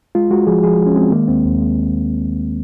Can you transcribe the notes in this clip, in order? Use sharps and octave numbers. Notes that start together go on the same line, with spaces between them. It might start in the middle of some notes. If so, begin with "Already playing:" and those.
G#3 F4
G#3 F#4
F3 G#4
F3 G#4
G#3
C#4
G#3 C4
D#3 A#3
D#2 C4
D#2
G#3